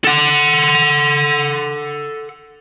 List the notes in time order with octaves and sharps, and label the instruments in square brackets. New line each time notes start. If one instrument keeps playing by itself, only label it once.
[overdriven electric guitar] A4 F#5